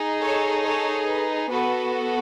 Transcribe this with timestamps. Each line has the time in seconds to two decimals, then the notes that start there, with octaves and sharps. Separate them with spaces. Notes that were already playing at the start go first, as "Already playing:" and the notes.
Already playing: D#4 G#4
0.22 A4 C#5
0.64 A4 C#5
1.08 B4
1.51 B3 F#4 A4 B4